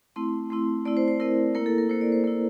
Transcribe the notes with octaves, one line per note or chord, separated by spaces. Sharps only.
A3 C4 E4 C6
A3 C4 E4
A3 C4 E4 D5
C5
C5
A3 C4 E4 A#4
A#3 E4 A#4
A4
A#4
A#3 E4 C5
D5
C5
A#3 E4